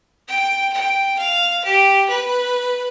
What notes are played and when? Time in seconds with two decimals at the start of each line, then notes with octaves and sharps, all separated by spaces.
0.28 G5
0.73 G5
1.19 F5
1.64 G4
2.09 B4